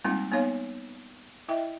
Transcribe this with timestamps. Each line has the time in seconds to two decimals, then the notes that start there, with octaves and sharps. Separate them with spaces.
0.05 G3 G#3 A#3 C4 D#4 F4
0.32 A#3 B3 D#4 C#5 F5
1.49 E4 D#5 E5 G5